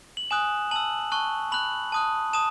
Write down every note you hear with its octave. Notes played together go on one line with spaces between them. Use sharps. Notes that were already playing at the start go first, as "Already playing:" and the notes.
F#7
G#5 D#6 F#6 E7
A5 E6 F#7
A5 C#6 F#6
B5 F#6 F#7
A5 D#6 F#6
A5 D#6 E7